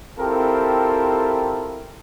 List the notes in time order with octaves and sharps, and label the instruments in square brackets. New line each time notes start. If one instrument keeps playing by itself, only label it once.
[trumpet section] C4 E4 F4 G4 A4 A#4